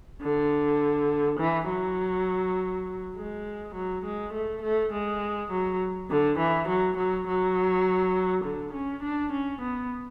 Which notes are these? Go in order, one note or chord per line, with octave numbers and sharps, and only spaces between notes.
D3
E3
F#3
G#3
F#3
G#3
A3
A3
G#3
F#3
D3
E3
F#3
F#3
F#3
D3
C#4
D4
C#4
B3